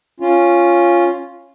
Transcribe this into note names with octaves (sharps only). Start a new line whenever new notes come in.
C#4 F4